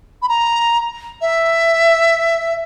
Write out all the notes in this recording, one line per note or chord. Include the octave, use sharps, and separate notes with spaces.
B5
A#5
E5